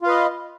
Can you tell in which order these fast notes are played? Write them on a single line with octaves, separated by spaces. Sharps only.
F4 F5 B4 D#5